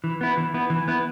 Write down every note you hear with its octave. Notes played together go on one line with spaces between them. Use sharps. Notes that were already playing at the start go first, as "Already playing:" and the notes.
E3
B3 E4
E3
B3 E4
E3
B3 E4